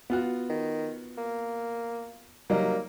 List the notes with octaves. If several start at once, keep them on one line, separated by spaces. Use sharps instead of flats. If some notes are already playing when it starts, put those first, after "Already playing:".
B3 F4 F#4
D#3
A#3
F#3 G3 A#3 D#4